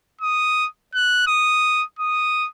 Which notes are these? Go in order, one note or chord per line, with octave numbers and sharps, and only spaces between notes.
D#6
F#6
D#6
D#6